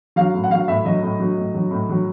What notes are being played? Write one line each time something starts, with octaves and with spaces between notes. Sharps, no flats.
F#3 F5
A2
F#5
F#3 F5
A2 E5
F#3 D#5
A2
F#3
A2
F#3
A2
F#3